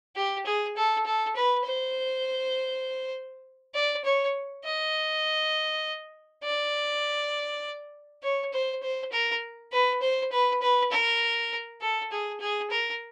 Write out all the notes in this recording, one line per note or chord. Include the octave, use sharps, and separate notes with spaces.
G4
G#4
A4
A4
B4
C5
D5
C#5
D#5
D5
C#5
C5
C5
A#4
B4
C5
B4
B4
A#4
A4
G#4
G#4
A#4